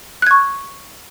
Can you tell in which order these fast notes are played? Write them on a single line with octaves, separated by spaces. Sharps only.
F#6 G#6 C#6